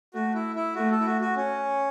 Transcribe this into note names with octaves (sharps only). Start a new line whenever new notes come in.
A3 F#4
E4
E4
A3 F#4
A4
E4
F#4
F#4
C#4